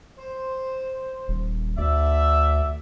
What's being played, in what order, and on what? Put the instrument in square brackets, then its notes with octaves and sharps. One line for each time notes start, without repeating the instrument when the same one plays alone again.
[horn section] C5
[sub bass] D#1
[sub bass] D2 [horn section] D3 D5 E5